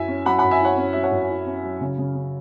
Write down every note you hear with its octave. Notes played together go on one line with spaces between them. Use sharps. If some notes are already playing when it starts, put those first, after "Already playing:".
Already playing: F#2 E4 E5 G#5
C#4
F#3 F#5 B5
F#5 B5
F#2
E5 G#5
E4 C#5 F#5
C#4
F#3 E5
C#5 F#5
F#2
E4
C#4
F#3
C#3
C#3
C#4